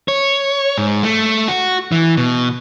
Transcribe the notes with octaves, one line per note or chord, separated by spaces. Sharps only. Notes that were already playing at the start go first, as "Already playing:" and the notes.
C#5
G#2
A3
F#4
E3
B2